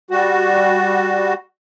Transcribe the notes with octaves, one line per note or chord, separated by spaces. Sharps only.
G3 F#4